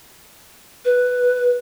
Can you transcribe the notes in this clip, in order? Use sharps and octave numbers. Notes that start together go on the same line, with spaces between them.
B4